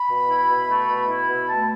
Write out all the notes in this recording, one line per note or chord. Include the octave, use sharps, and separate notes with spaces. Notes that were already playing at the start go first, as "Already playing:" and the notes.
Already playing: B5
B2
E4
B2
A3
B2
E4
B2
A3 A5